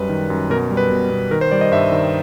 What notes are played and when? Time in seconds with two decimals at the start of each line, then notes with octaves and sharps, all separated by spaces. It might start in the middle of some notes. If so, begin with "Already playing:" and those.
Already playing: F#2 G3 B4
0.09 D#3
0.30 F#2
0.50 B2 A#4
0.71 G3
0.77 B4
0.91 B2
1.11 B2
1.31 D#3 A#4
1.41 C5
1.51 G3 D5
1.61 D#5
1.72 G2 E5
1.92 D#3